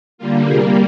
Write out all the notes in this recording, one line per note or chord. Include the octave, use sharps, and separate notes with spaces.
D3 G3 A#3 F4
C3 G3 A#3 F4 G#4